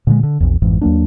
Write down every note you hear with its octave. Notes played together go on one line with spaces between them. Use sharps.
A#2 D3 F#3 G#3
D3
A#1 E2
G#1 F2 G#2 E3
D#2 F#3 A#3 D4